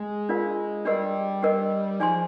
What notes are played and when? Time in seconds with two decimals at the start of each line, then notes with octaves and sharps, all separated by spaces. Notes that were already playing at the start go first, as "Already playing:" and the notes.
Already playing: G#3
0.29 D4 F4 A#4 D5 F5
0.85 G3 D4 G4 A#4 D#5
1.43 D4 G4 A#4 D#5
2.00 F3 D#4 G#4 D5 G#5 C6